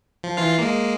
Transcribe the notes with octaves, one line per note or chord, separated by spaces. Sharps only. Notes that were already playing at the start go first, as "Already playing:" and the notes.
F3
E3 F4 F5
G#3 A#3